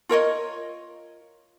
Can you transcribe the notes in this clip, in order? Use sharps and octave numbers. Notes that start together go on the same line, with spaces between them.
F4 A#4 C#5 D#5